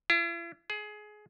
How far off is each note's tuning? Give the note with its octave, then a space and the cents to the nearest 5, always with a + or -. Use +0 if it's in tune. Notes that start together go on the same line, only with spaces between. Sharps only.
E4 +45
G#4 +20